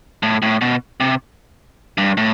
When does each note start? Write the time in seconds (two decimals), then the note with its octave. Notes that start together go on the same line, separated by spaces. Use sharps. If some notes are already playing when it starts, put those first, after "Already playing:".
0.23 A2
0.42 A2
0.61 B2
1.00 C3
1.98 G2
2.17 A2